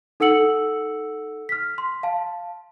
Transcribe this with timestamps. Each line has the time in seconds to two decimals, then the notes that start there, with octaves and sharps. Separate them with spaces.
0.20 D#4 A4 F#5 E6 C#7 F#7
1.49 F6 B6
1.78 C6
2.03 F5 A5